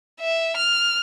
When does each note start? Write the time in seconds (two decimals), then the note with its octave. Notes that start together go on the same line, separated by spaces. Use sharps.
0.21 E5
0.57 F6